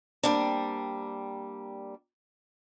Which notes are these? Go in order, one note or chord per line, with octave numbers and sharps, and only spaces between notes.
G3 A#3 C4 D4